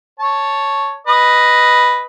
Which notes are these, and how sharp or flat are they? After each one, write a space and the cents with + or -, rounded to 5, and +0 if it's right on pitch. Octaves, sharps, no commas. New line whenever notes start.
C#5 +0 A5 +0
B4 +0 D#5 +0